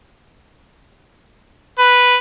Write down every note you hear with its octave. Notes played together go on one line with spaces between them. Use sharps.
B4